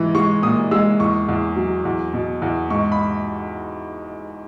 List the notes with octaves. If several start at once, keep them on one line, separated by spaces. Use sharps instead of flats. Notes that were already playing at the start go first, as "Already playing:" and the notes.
Already playing: G#2 E3
G#3 C#6
A#2 D#6
G#3 E6
E2 C#6
E2
F#3
E2
B2
E2
G#2 C#6
B5